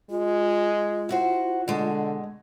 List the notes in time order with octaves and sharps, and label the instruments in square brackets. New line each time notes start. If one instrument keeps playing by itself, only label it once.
[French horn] G#3 [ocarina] F4
[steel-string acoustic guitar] E4 F#4 C5
[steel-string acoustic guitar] B2 G#3 [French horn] D3